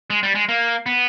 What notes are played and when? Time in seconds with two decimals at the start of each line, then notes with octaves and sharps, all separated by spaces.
0.10 G#3
0.23 G3
0.35 G#3
0.49 A#3
0.86 B3